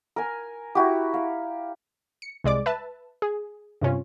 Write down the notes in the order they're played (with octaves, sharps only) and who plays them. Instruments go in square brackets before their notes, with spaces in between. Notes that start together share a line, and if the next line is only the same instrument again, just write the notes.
[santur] A#4 G#5
E4 F#4 G4
F5
[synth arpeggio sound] C#7
C2 G#3 D5 D6
B4 E5 A5
G#4
G2 C3 C#4 F4